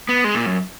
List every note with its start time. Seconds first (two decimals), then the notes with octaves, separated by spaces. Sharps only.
0.09 B3
0.24 G#3
0.35 A#2
0.46 F#2